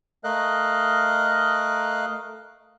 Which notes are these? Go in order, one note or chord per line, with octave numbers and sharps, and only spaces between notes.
A3 A#4 D#5 F5 F#6